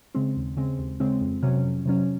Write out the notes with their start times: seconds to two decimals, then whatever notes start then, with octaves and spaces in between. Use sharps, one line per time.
0.15 C#3 G#3 C4
0.36 D#2
0.57 C#3 G#3 C4
0.79 D#2
1.00 C#3 G#3 C4
1.21 F2
1.43 C3 F#3 C#4
1.64 F2
1.86 C3 F#3 C#4